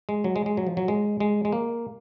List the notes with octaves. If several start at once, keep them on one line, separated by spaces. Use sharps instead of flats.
G#3
F#3
G#3
G#3
F#3
F3
F#3
G#3
G#3
G#3
A#3